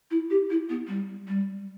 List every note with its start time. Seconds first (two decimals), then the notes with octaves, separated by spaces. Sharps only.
0.11 E4
0.30 G4
0.50 E4
0.69 B3
0.88 G3
1.28 G3